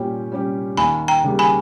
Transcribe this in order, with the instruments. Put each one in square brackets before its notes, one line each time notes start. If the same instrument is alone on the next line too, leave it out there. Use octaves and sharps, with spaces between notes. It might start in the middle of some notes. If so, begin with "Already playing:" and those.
Already playing: [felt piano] A#2 G3 C#4 G4 [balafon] G5
[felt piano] G3 C#4 G4
[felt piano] D#2 [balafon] G#5 B5
[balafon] G5 A#5
[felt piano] C#3 G3 A#3
[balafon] G#5 B5